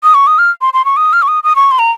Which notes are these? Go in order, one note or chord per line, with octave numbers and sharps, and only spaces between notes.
D#6
C#6
D#6
F6
C6
C6
C#6
D#6
F6
C#6
D#6
D#6
C#6
C6
A#5